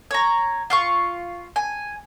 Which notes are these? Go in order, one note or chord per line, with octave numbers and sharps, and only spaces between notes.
C#5 A#5
F4 F5 C#6
G#5